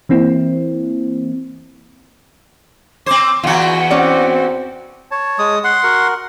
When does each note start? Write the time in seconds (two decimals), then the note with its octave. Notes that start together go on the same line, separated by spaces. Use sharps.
0.09 E3 A#3 C4 E4
3.06 C4 C5 D6
3.43 E2 E3 F4 F#4 F#5
3.90 C4 C#4 F#4 D5
5.11 C#5 A5
5.39 G#3 D#6
5.64 F#5 C6
5.83 F#4 A#4